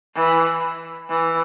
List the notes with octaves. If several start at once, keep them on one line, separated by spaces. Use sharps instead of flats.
E3
E3